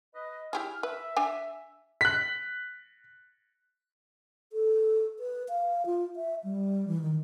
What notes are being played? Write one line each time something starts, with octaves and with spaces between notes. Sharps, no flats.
B4 D#5
E4 G4 G#4 F6
B4 E5
D4 G#5
F#6 B6
A4
B4
F5
F4
E5
G3
E3
D#3